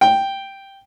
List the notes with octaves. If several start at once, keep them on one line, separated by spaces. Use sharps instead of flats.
G5